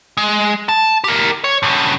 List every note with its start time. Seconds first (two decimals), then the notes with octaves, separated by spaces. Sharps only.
0.17 G#3
0.69 A5
1.04 G4 A#4
1.44 C#5
1.63 G2 C#3